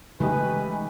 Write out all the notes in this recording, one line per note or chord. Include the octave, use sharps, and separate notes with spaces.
C#3 E3 G#3 A3 D#4 G4 B4 G#5